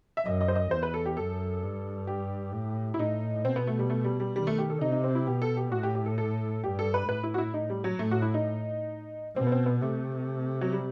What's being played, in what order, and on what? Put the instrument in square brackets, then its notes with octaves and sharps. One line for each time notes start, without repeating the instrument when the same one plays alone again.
[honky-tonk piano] E5
[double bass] F#2 [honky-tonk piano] D#5
[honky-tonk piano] D#5
C5
D#5
[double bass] E2 [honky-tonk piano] C5
[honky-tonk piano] B4
A4
G4
[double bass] F#2 [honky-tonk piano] A4
[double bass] G2
[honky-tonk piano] G4
[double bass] A2
[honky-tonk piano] E4
[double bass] A2 [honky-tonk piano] D#4
[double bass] B2 [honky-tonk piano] C4
[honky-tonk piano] B3
A3
G3
A3
G3
G3
[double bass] D#3 [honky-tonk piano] G3
[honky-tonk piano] A3
G4
A4
[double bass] C3 [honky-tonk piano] D#4
[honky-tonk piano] D#4
C4
E4
[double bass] B2 [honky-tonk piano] G4
[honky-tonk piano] A4
G4
[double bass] A2 [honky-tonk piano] F#4
[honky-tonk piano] G4
G4
A4
A4
[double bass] G2 [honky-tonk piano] G4
[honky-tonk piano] A4
B4
[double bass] A2 [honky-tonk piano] B4
[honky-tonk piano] E4
F#4
E4
D#4
G3
F#3
[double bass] A2 [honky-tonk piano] A3
[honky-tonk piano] F#4
E4
D#4
[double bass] B2 [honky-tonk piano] C4
[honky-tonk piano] B3
C4
B3
[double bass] C3 [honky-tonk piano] A3
[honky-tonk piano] F#3
G3